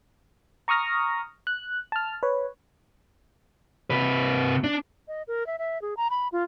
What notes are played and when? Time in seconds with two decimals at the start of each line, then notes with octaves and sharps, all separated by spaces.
0.68 A#5 C#6 D#6 F6 A#6
1.47 F#6
1.92 A5 F6
2.23 B4 C#5
3.90 C3 B4
4.64 D4
5.08 D#5
5.28 A#4
5.47 E5
5.59 E5
5.82 G#4
5.97 A#5
6.10 B5
6.32 F4